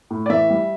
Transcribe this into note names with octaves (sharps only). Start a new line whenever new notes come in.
A2
D5
E3 E5
G3